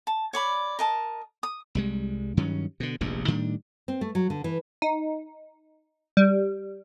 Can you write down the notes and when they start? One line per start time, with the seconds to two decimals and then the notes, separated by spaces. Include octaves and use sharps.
0.07 A5
0.33 C#5 D5 B5
0.79 A#4 D#5 A5
1.43 D#6
1.75 C2 G3 G#3
2.37 G2 D#3 F#3 C#4
2.80 B2 D3
3.01 F1 A#1 E2 G2
3.28 A2 D#3 G3 D4
3.88 C4
4.01 A3
4.15 F#3
4.30 D3
4.44 E3
4.82 D#4
6.17 G3